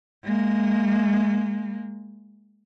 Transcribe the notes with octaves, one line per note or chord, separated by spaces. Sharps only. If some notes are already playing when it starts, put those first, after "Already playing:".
G#3 A#3